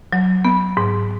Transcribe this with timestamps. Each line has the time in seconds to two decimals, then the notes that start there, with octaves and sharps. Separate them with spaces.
0.13 F#3
0.45 B3
0.77 G#2